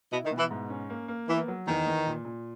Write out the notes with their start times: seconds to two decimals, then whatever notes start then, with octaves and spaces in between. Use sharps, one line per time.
0.12 B2 E4
0.24 D#3
0.31 B2
0.37 E3
0.51 G#2
0.70 C#4
0.90 A#3
1.08 A#3
1.28 E3 B3
1.48 F#3
1.67 E2 D#3
1.86 E2
2.06 A#2
2.25 A#2